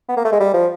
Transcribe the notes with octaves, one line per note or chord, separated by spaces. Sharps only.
B3
A#3
A3
G#3
G3
F3